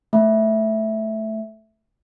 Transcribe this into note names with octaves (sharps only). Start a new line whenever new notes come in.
A3 E5